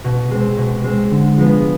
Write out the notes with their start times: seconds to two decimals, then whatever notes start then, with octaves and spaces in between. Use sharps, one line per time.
0.04 B2
0.31 G#3 C4
0.57 B2
0.84 G#3 C4
1.11 D3
1.37 F3 G#3 B3